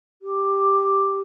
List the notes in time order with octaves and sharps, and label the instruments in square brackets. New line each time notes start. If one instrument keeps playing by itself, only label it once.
[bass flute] G4